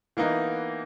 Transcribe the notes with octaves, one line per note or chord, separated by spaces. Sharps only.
E3 A#3 B3 D#4 F#4